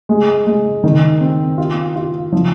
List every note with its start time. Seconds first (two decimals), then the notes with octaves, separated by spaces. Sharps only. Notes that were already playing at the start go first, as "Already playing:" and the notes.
0.09 G#3
0.47 G#3
0.84 D#3
1.21 C4
1.58 F4
1.96 F4
2.32 F3